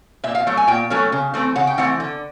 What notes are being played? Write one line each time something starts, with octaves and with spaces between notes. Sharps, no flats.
A#2 E5
F5
F#3 A3
G#5
A#2 G5
F#3 A3 C#4
C#3
E3 A3 C4
C#3 F#5
G5
E3 A3 C4 F#5
D3